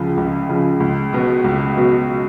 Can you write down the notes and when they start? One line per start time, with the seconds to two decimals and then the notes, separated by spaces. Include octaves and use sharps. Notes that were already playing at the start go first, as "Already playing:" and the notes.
Already playing: C#2 C#3 F3
0.17 C#2
0.49 C#3 F3
0.80 C#2
1.13 B2 F#3 B3
1.44 C#2
1.77 B2 F#3 B3